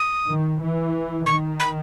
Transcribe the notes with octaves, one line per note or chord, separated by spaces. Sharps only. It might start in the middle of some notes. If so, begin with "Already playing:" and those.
Already playing: D#6
D#3
E3
D#3 C#6
B5